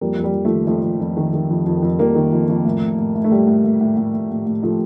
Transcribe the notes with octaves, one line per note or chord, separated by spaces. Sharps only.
F2 G3 A#3
F2
G3
F2
F3 A3
D#3
F2 F3 A3
F2
F2
D#3
D#3
F2
F2
F2
F2 G3 A#3
D#3
F2
F2
A2
A2
A2
A2
A3
A2 G3
A2
A2
A2
A2
A2
A2
A2
A2 F3 A3